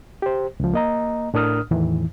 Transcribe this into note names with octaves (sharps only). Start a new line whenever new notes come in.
G4 C5
C#2 F3
A#3 D#5 A#5
A2 D4 A#4 D#6 F6
E2 A2 D#3 E3